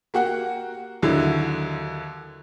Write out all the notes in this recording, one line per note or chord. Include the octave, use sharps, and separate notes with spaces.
A#3 F#4 G4 F#5
D#2 D3 F#3 E4